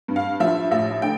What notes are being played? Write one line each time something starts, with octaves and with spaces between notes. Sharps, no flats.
G2
F5
F3 E5
A1 E5
D3 G5